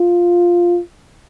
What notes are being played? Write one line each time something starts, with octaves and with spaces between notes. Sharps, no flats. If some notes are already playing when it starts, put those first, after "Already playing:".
Already playing: F4